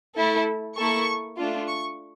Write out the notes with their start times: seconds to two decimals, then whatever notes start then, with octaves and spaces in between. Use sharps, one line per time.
0.17 A3 E4 A4
0.77 A#3 E4 A4 C#6
1.38 A3 D4 F4
1.68 C#6